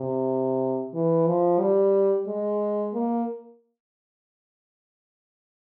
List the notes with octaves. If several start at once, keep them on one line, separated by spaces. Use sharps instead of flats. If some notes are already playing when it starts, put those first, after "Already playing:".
Already playing: C3
E3
F3
G3
G#3
A#3